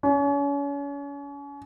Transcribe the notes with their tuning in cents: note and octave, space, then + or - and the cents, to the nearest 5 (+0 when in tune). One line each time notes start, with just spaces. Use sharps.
C#4 +35